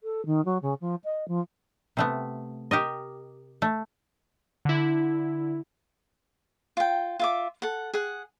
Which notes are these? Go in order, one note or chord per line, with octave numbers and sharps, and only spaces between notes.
A4
D#3
F#3
C#3
F3
D#5
F3
C3 A3 B3
G4 A#4 D#5
A3
D3 E4
F4 G5
F4 E5 D6
A4 F#5
G#4 F#5